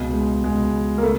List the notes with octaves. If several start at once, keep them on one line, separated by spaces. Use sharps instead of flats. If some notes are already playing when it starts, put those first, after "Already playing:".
Already playing: C#2 B2
G#3
C#2 B2 G#3
A#3
C#3 A3